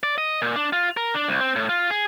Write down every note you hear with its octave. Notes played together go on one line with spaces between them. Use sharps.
D5
D#5
A#2
D4
F4
A#4
D4
C2
C4
A2
F4
G#4